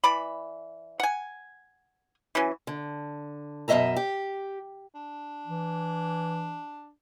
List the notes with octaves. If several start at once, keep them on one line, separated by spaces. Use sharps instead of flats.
E3 D5 B5
F#5 G#5
E3 F#3 C#4
D3
F#2 B2 A#3 D#5 E5 A#5
G4
D4
E3